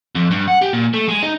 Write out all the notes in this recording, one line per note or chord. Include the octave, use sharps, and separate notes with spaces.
F2
G2
F#5
G4
A#2
A3
G#3
D#4